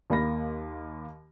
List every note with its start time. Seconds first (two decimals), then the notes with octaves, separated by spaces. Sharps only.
0.10 D#2 A#3 B5 A#6